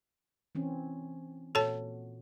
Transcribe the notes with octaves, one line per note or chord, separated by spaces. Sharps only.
E3 C4 C#4
A#2 F#4 A4 C#5 A5